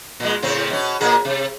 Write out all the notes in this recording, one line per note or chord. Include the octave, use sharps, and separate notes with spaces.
A#2 G#3
A2 C#3 C4
B2 C#4
A#2 A#3 G#4
C3